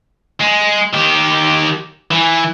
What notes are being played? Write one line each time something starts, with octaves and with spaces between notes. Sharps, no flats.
G#3
D#3 G4
E3